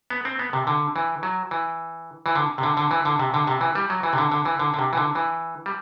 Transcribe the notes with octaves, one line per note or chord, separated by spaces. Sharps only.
B3
C4
B3
C3
D3
E3
F#3
E3
E3
D3
C3
D3
D3
E3
D3
C3
D3
C3
E3
G3
F#3
E3
C3
D3
D3
E3
D3
D3
C3
E3
D3
E3
G3